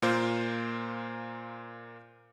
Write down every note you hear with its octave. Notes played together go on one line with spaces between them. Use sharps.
A#2 A#3 F4 C5